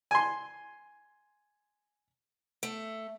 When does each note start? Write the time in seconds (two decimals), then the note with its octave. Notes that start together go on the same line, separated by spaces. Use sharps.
0.11 G#5 C6
2.63 A3